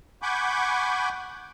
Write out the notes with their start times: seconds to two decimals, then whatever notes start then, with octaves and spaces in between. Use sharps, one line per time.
0.22 F#5 G#5 B5 C#6 D6 G6